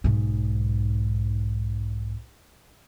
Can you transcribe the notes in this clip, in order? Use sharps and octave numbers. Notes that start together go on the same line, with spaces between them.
B1 G#2